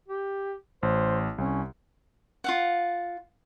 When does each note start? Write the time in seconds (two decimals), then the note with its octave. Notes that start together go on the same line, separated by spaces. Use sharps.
0.08 G4
0.83 A1 C5
1.38 C2 C#4
2.44 F4 F5 F#5